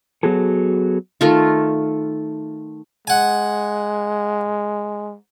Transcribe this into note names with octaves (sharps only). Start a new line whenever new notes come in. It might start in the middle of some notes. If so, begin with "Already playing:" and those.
F#3 B3 F#4 G#4 A4
D#3 A3 F4
G#3 F#5 G#5